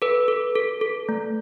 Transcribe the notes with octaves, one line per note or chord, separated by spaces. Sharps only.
A4 B4
A4
A4
A4
A3